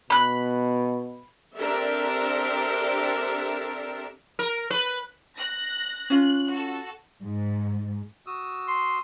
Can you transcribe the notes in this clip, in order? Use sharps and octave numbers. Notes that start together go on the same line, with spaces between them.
B2 B5 F#6
C4 D4 G4 A4 A#4 E5
A#4
B4
F#6 A#6
C#4 F4 F#6
F#4 A4
G#2
F#4 D#6 E6
C6